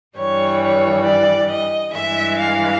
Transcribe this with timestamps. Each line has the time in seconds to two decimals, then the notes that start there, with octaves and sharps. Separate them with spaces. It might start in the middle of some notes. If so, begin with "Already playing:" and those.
0.16 G2 E3 G3 C#5
0.61 C#5
1.04 D5
1.49 D#5
1.93 G2 E3 G#3 E5
2.38 F5